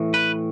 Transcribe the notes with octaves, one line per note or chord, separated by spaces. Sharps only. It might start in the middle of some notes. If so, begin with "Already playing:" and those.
Already playing: A2 E3
B4